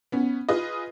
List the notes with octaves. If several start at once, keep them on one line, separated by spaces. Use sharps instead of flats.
B3 C#4
F4 G#4 B4 D#5